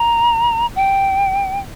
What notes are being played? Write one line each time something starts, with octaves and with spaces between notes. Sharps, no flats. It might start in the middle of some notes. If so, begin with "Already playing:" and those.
Already playing: A#5
G5